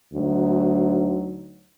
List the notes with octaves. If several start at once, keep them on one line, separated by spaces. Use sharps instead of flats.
D2 F#3 D#4